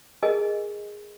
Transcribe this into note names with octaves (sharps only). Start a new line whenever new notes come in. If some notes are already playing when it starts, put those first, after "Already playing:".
G#4 A#4 D#5 G#5